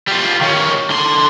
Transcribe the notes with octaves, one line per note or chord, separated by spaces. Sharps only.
G3 F4
D#3 C#4
D3 C6